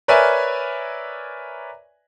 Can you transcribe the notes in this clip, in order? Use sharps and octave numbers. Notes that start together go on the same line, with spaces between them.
A#4 B4 C#5 D5 E5 G#5